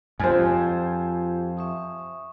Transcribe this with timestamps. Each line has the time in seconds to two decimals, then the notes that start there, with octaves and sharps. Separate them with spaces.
0.20 F2 F4 G4 C5 G#5
1.57 E5 C#6 D#6